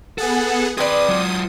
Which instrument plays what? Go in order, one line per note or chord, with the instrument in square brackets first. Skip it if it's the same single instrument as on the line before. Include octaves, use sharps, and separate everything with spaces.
[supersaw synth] B3 G#4 F#5 [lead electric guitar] A4
[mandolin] C4 D5 [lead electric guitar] G#4 B4 [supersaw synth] D#6
[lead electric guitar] F#3 F4